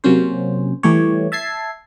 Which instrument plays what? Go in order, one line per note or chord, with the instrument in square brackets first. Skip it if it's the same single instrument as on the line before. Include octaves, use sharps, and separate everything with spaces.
[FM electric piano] C3 F#3 A#3 C#4 C5
E3 G3 A3 G4 C#5
E5 A5 G#6 C7